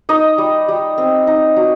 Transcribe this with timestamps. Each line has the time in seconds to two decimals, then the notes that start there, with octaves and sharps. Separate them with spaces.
0.09 D#4 D#5
0.38 G3
0.68 G3
0.98 C4
1.27 D#4
1.56 F#3